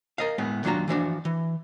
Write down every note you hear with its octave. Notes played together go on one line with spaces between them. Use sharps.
A#4 D#5 F5
A2 G#3 B3
D#2 F#3 D4 F4 F#4 A#5
E3 F3 D4 F#4
E3